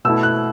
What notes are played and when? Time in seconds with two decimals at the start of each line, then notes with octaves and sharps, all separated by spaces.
0.05 B2 A3 E4 E6
0.23 F#6